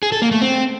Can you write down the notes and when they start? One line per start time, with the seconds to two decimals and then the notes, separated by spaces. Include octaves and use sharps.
0.03 G#4
0.12 A4
0.22 A#3
0.32 A3
0.41 C4